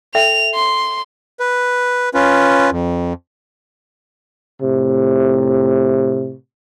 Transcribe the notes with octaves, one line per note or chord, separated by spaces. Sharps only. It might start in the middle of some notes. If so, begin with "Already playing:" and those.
A4 E5 G5 F7
C6
B4
C#4 F4 B4
F2
A2 C3